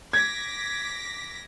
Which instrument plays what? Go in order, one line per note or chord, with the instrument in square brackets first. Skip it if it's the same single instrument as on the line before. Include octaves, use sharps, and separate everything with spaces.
[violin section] D6 A#6 B6 [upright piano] G#6